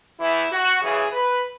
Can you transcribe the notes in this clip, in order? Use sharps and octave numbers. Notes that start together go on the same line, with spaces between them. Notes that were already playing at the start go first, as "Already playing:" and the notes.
E2 E3 E4
F#4
F#2 C#3 E3 G#4
B4